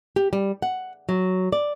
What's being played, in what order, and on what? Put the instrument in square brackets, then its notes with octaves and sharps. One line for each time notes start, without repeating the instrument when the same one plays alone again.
[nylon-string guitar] G4
G3
F#5
F#3
D5